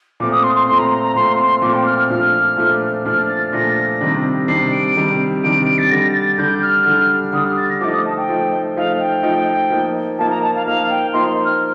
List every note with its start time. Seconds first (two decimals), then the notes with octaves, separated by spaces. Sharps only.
0.20 A#2 A3 C4 D6
0.31 D#6
0.43 C6
0.55 C6
0.67 A#2 A3 C4 C6
0.79 A#5
0.90 A#5
1.03 A#5
1.15 A#2 A3 C4 C6
1.39 C6
1.62 A#2 A3 C4 D6
1.74 G5
1.86 F6
1.98 F6
2.10 A#2 F3 A3 D4
2.57 A#2 F3 A3 D4
3.05 A#2 F3 A3 D4 F6
3.29 A6
3.53 A#2 F3 A3 D4 A#6
4.01 C3 D#3 G3 D4
4.48 C3 D#3 G3 D4 C7
4.72 D7
4.96 C3 D#3 G3 D4
5.43 C3 D#3 G3 D4 D7
5.78 A6
5.91 D3 G3 D4 A#6
6.15 A6
6.38 D3 G3 D4 G6
6.62 F6
6.86 D3 G3 D4
7.33 D3 G3 D4 D#6
7.45 F6
7.57 A6
7.69 A#6
7.80 F3 A3 D#4 D6
7.92 D#6
8.05 A5
8.17 G5
8.29 F3 A3 D#4
8.76 F3 A3 D#4 F5
8.99 G5
9.23 F3 A3 D#4
9.70 F3 A#3 D#4
10.18 F3 A#3 D#4 A5
10.30 A#5
10.42 A5
10.54 F5
10.66 F3 A#3 D#4 F5
10.90 G5
11.13 F3 A#3 D#4 C6
11.45 F6